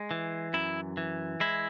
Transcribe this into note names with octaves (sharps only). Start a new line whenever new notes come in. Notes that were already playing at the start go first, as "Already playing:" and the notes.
Already playing: G#3
E3
F#2 E4
E3
G#3 E4